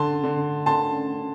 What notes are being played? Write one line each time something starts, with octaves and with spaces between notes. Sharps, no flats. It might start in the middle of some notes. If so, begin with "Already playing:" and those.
Already playing: D3 A5 C6
D3
D3 A5 C6